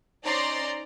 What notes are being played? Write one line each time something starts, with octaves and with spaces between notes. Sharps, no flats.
C#4 D#4 C5 D5 A#5 C6